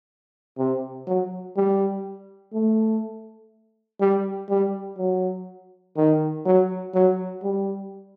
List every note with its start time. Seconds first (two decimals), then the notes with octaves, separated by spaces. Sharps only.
0.58 C3
1.07 F#3
1.56 G3
2.53 A3
4.01 G3
4.49 G3
4.98 F#3
5.97 D#3
6.45 F#3
6.94 F#3
7.43 G3